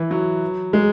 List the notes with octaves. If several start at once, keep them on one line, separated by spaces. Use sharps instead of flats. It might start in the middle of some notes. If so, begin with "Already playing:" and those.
Already playing: E3
F#3
G#3